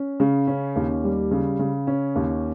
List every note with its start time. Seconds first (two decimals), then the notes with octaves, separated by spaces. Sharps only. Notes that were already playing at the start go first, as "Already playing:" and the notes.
Already playing: C#4
0.20 C#3
0.47 C#4
0.76 D#2
1.04 G3
1.31 C#3
1.59 C#3
1.87 C#4
2.16 D#2